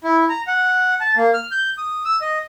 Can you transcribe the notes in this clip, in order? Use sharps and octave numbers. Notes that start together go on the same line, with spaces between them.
E4
A#5
F#5
A5
A#3
F6
G6
D#6
E6
D#5